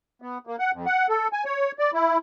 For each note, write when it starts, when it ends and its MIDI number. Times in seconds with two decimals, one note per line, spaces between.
0.22 0.38 59
0.47 0.56 58
0.59 0.71 78
0.73 0.86 41
0.86 1.07 78
1.09 1.28 69
1.33 1.44 80
1.45 1.72 73
1.79 1.91 74
1.94 2.18 64